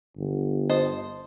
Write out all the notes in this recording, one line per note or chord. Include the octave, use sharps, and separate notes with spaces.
G1
C5 D#5 A5